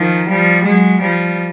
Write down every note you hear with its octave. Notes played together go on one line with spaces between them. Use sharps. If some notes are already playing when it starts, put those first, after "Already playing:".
Already playing: D#3 F3
F3 G3
F#3 G#3
F3 G3